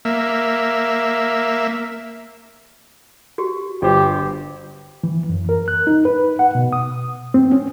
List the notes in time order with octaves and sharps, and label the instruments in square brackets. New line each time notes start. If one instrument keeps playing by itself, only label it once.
[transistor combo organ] A#3 E5
[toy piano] F#4 G4
[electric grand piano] G1 B4 C5 [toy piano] F4 [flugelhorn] G4
[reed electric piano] E3
F#2
A#4
F#6
D#4
B4
F#5
B2
D#6
C4
C#4